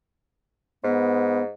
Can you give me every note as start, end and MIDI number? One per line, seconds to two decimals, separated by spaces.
0.84 1.52 44
0.84 1.43 59